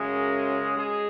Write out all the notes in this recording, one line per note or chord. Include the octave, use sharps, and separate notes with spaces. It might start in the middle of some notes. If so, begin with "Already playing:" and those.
Already playing: F#2 C#3 G#3
G#3 G#4